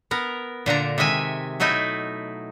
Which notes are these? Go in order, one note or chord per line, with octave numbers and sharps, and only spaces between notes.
B3 A#4
A#2 D3 D4 A#5
C3 D#3 G#3 E5 G#5
B2 F#3 A3 D#4 E4 E5